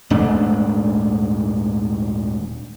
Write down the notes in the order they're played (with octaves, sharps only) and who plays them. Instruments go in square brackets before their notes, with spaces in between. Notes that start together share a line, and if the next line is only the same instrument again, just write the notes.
[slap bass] D#1 G#2 A3 D4